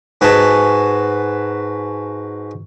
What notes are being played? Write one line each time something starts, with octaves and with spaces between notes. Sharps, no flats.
G#2 F#4 B4 G#5 A5